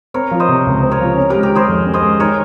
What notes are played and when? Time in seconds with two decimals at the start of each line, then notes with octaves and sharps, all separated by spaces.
0.14 C4 A#4 C#5
0.31 F3
0.40 C5 D#5
0.49 C3
0.66 C#2
0.83 C4
0.91 A#4 C#5
1.00 F3
1.17 C#4
1.30 G#3 G4 A#4
1.43 G4 A#4
1.52 D#3 G#4 C5
1.68 F2
1.86 C#4
1.94 C5 D#5
2.03 G#3
2.19 D#3 A#4 C#5